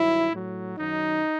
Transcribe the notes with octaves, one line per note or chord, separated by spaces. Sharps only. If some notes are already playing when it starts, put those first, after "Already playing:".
Already playing: G2 D#3 F#3 E4
A2 F#3
F#2 D#3 F#3 D#4